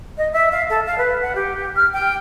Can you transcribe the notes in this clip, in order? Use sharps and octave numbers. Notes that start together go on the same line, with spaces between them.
D#5
E5
F5
A4
F5
B4
F#5
G4
F6
G5